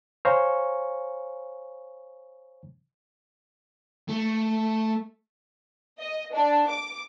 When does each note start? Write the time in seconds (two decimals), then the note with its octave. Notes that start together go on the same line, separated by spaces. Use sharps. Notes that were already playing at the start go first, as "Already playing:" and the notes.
0.25 C5 C#5 F5 G#5 A#5 C#6
4.08 A3
6.00 D#5
6.33 D4
6.69 D6